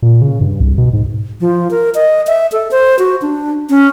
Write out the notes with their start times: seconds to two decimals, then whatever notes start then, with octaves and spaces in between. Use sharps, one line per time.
0.02 A#2
0.21 C#3
0.41 G2
0.60 C2
0.78 B2
0.93 G#2
1.41 F3
1.71 A#4
1.95 D#5
2.27 E5
2.52 A4
2.71 C5
2.99 F#4
3.22 D4
3.69 C#4